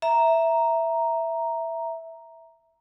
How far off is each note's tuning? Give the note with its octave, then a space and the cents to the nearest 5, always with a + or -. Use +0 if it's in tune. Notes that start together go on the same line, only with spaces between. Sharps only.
E5 +0 A#5 +0